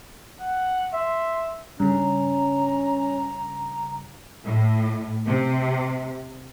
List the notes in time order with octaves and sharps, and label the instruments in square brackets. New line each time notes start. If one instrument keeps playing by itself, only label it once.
[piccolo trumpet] F#5
[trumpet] E5 [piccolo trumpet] C6
[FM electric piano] G2 C#3 [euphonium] C#4 [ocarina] A#5
[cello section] A2
C3